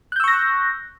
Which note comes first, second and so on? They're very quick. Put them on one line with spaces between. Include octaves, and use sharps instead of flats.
F#6 G6 E6 C#6 A#6